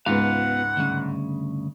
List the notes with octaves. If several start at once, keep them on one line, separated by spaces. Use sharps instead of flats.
C#2 G#2 B3 F4 F5 F#5
D2 G2 C#3